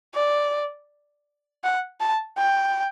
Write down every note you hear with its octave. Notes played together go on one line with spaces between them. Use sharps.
D5
F#5
A5
G5